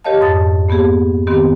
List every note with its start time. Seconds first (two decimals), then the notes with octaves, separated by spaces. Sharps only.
0.04 G4 A#4 C#5 D#5 F5 A5
0.21 F2 G#2 A5 D#6 A6
0.69 A#3 B3 G4 G#4
1.27 D#3 B3 C4 G4